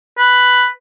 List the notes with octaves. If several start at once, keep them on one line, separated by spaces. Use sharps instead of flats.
B4